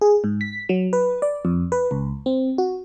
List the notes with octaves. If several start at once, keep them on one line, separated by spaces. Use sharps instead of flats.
G#4
G#2
B6
F#3
B4
D5
F2
B4
C#2
C4
F#4